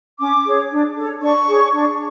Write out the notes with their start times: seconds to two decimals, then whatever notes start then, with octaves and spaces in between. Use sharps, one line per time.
0.20 C#4 D6
0.45 G#4 C#5
0.71 D4
0.97 A4 C#5
1.22 D4 C#6
1.48 G#4 C#5
1.73 D4